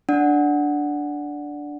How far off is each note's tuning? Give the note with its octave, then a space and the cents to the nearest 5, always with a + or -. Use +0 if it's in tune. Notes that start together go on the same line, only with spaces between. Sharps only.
D4 -5 D5 +0 F#5 -5